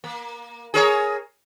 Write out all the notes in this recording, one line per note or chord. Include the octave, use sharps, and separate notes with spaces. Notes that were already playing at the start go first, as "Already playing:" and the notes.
A#3
G#4 A#4 C#5